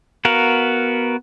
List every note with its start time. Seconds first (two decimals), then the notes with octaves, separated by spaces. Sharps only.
0.25 B3 F#4 A#4 F5